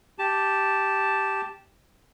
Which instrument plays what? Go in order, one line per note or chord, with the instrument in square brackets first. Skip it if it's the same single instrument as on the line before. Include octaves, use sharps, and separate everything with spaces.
[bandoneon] G4 A5